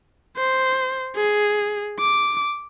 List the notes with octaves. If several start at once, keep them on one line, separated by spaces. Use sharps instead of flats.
C5
G#4
D6